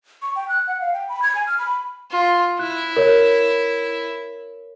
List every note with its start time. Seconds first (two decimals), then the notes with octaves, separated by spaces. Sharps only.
0.22 C#6
0.36 G5
0.49 F#6
0.68 F#5
0.81 F5
0.93 G5
1.09 B5
1.22 G#6
1.35 G#5
1.47 F6
1.59 B5
2.11 F4
2.59 E4 F#6
2.96 A#4 C#5